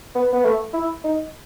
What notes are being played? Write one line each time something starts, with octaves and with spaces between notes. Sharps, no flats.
B3
B3
A3
E4
D#4